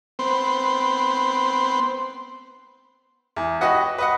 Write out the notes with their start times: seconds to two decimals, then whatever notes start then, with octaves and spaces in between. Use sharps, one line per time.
0.19 B3 C4 C5
3.36 E2
3.61 F#4 G4 B4 D#5 F#5
3.98 B4 D#5 F#5